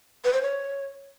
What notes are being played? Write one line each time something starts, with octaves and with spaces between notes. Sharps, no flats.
B4
C5
C#5